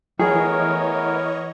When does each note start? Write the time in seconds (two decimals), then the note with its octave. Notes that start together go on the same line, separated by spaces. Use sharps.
0.19 E3 A3 B3 G#4 A#4 C#5 D#5